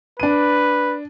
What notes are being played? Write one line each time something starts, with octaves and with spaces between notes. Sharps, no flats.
D4 B4 D#7